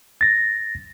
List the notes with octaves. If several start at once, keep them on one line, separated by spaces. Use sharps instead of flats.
A6 A#6